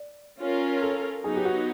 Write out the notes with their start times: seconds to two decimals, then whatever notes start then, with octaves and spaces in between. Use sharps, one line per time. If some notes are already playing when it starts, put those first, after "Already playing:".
Already playing: D5
0.39 C#4 F4 A#4
0.82 A4
1.24 F#3 B3 D#4 G#4
1.36 G4
1.45 F#4